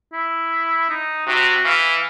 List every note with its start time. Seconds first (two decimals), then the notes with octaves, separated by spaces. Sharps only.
0.13 E4
0.89 D#4
1.27 C3 F#4
1.65 E3 F5